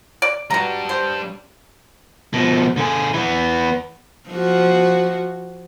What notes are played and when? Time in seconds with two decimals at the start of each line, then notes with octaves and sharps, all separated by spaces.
0.22 D5
0.50 B2 G3 D4 A#5
0.89 C5
2.34 B2 F3
2.77 D3 G#4
3.14 E3 B3
4.30 F3 F#4